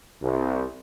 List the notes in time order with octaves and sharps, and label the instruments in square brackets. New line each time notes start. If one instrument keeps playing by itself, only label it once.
[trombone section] C2